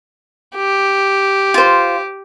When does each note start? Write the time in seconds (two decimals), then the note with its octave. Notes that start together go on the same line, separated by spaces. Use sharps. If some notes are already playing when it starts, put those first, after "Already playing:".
0.56 G4
1.54 F4 C5